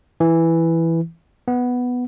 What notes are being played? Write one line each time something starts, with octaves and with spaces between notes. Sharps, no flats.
E3
B3